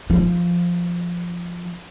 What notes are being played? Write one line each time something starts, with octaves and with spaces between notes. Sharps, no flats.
F3